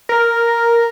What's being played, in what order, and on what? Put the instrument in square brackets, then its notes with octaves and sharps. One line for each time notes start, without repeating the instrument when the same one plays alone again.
[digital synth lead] A#4